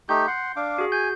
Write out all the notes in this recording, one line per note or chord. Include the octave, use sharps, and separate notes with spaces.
A3 D#4 G4 G6
F#5 C6
D4 F5 D6
F#4 G#4
G#5 G6